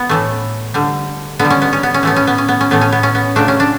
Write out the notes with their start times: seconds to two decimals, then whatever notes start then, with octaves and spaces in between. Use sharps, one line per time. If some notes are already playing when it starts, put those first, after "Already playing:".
Already playing: B3
0.09 A2 E3 A3
0.74 D3 G3
1.39 D3 B3
1.45 G3
1.50 C#4
1.62 B3
1.73 C#4
1.83 B3
1.94 C#4
2.03 A2 E3 A3 B3
2.16 C#4
2.27 B3
2.38 C#4
2.49 B3
2.61 C#4
2.71 A2 E3 A3 B3
2.81 C#4
2.92 B3
3.03 C#4
3.15 B3
3.36 C#3 F#3 A3 D4
3.48 C#4
3.60 D4